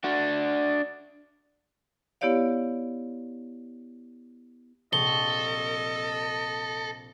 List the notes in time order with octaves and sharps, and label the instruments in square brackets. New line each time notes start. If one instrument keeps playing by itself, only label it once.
[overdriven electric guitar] D4 F#4
[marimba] B3 E4 G4 C#5 D5 F5
[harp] A#1 C3 C#6 [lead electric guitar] A4 [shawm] D#5 [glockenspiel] G7